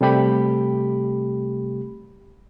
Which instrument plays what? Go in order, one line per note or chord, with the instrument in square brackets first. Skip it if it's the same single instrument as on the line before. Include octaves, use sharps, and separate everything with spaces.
[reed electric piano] C3 G3 A3 G4 B5